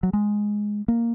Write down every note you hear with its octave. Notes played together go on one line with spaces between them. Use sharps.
F#3
G#3
A#3